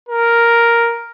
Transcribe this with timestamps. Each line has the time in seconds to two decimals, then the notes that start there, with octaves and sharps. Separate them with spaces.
0.09 A#4